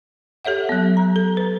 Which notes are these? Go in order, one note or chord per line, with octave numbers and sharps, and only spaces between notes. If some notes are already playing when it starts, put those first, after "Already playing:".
G4 A4 C#5 E5 F#5
F#3 B3
A#5
A4
B4